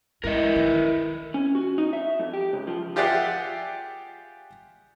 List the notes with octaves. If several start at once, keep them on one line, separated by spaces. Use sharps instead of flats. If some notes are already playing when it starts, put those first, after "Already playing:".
G#3 E4 A#4 B4 D#5
D#3
C#4
F#4
D#4
E5
F2
G4
C#2
F3
F4 G4 G#4 D5 E5 F#5